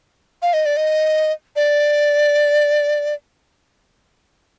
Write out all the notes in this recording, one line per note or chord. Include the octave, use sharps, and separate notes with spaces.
F5
D#5
D5
D#5
D5